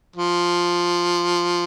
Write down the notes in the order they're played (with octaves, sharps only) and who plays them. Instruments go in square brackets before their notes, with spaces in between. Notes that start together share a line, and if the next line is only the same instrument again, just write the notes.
[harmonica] F3